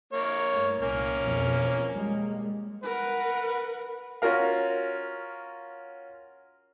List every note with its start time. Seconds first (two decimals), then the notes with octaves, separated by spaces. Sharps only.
0.13 A#3 C#5
0.52 G2 A3
0.82 C2 A#2 A#3 C#4
1.20 F2 B2 F3
1.93 G3 G#3 A#3
2.83 A#4 B4 F#5
4.22 C#4 F4 F#4 A#4 F5